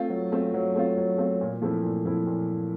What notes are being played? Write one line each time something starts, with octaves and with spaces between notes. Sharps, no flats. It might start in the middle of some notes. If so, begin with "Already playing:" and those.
Already playing: A3 C4 F4
F#3
A3 C4 F4
F#3
A3 C4 F4
F#3
A3 C4 F4
A#2
F3 A3 C4 E4
A#2
F3 A3 C4 E4
A#2